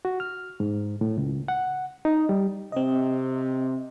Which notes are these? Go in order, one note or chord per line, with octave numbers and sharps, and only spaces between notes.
F#4
F6
G#2
A2
C#2
F#5
D#4
G3
C3 C4 D#5